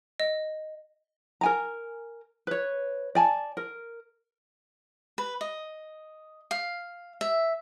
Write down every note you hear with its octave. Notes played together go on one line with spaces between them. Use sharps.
D#5
A#4 G#5 A#5
B4 C#5
D5 G#5 A5
A#4
B4
D#5
F5
E5